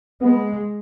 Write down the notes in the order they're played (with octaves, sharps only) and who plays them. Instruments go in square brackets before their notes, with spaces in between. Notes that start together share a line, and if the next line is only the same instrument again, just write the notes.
[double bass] G#3 [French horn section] B3